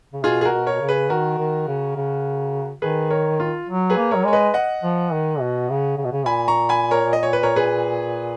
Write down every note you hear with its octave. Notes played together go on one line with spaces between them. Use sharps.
C#3
B2 F4 G#4
G#4
F#4 A#4
B2
A#4 C#5
C#3
G#4 B4
D#3 F#4 A#4
D#3
C#3
C#3
D#3 G#4 B4
A#4 C#5
F4
F#3
G#4 B4
A#3
F#3 A#4 C#5
G#3 C#5
B4 D#5
D#5 F#5
F3
D#3
B2
C#3
C#3
B2
C#3
A#2 G#5 B5
A#5 C#6
G#5 B5
A#4 C#5
D#5
C#5
B4
A#4 C#5
G#4 B4